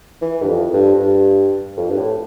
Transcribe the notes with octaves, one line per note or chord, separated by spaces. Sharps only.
E3
G2
F2
G2
G2
F2
G2
A2